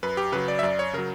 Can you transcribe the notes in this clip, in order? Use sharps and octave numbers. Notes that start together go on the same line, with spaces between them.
F#2 B4
G4
C#3 F#3 B4
D5
E5
F#2 D5
C#5
C#3 F#3 A#4